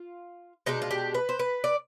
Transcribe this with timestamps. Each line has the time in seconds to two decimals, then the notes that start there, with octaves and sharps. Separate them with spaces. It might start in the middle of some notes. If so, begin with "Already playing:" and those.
Already playing: F4
0.66 B2 G#3 D4 D#4
0.82 F4
0.91 G4
1.14 B4
1.29 C5
1.39 B4
1.64 D5